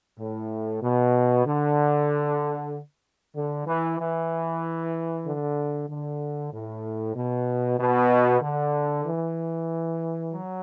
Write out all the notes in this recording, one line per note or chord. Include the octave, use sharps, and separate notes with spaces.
A2
B2
D3
D3
E3
E3
D3
D3
A2
B2
B2
D3
E3
F#3